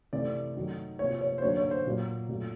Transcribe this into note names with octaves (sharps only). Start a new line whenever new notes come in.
C3 E3 A3 D5
D#3 F#3 A3
C3 F3 A#3 C#5
C#5
C5
D3 F#3 A#3 C#5
C#5
C5
A#2 F#3 A#3
A#2 F#3 A3